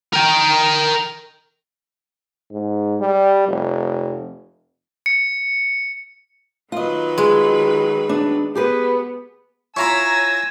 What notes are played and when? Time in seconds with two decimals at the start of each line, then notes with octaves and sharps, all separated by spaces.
0.14 A#4 G5
2.51 G#2
3.00 G3
3.48 F1
5.06 C#7
6.72 D#3 F#3 F4 B4 D#5
7.18 G#3
8.09 D4
8.55 B3 G4 G#4 B4
9.77 E4 F4 C#5 G#5 A#5 B5 E6 A#6